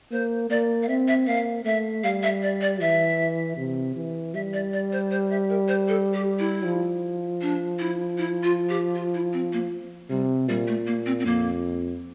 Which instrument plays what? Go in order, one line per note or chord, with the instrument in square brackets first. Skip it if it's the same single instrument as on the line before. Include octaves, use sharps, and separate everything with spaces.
[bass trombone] A#3 [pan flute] C5
[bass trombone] A#3 [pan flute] D5
[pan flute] F5
[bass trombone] C4 [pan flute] E5
[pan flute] E5
[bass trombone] A#3 [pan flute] F5
[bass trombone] A3 [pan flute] E5
[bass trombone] G3 [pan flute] F5
[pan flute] E5
D5
D5
[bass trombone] E3 [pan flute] E5
[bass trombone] C3
E3
[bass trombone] G3 [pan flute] E5
[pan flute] D5
D5
C5
C5
E5
A#4
C5
A4
G4
E4
[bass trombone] F3
[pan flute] D4
E4
E4
F4
G4
F4
E4
C4
A#3
[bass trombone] C3 [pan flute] G3
[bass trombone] A#2 [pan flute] G3
[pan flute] A3
A#3
C4
C4
[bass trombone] F2 [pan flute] A#3